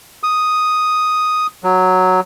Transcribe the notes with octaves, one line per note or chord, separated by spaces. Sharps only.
D#6
F#3